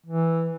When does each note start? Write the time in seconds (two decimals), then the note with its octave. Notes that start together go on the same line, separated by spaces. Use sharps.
0.06 E3